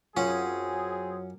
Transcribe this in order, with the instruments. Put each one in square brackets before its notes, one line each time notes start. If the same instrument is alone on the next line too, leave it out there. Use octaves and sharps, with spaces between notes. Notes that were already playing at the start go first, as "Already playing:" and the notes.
[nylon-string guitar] F#2 F4 F#5 [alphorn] F#3 [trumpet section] C4 G#4 [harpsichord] C#4